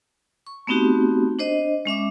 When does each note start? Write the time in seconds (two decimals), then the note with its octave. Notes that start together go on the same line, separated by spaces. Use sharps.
0.47 C#6
0.67 A3 B3 C4 D#4 F#4 G4
1.39 D4 C5 D#5
1.85 G#3 C#4 E5 D6